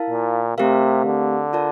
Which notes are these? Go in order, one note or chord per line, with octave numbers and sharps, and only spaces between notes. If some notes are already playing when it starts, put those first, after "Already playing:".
Already playing: E4 A#4 F5 A5
A#2
C3 A3 C4 G4 A#4 F5
D3
F4 A#4 D5 A5